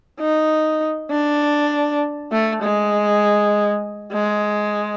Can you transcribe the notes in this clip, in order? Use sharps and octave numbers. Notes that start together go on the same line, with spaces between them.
D#4
D4
A3
G#3
G#3